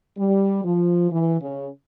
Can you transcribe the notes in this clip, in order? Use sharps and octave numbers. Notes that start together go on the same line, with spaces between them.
G3
F3
E3
C#3